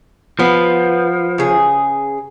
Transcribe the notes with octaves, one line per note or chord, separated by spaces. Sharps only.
F3 B3
C#3 G#4